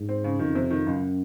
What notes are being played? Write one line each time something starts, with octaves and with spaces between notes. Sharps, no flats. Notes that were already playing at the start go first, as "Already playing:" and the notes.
Already playing: G#2
C4
C#3
F2 D#3
C3
D#3
C#2 F#2